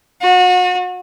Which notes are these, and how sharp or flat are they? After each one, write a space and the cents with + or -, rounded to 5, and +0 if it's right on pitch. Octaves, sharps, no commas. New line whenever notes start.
F#4 -35